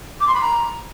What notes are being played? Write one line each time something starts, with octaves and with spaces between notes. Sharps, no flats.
D6
C6
B5
A#5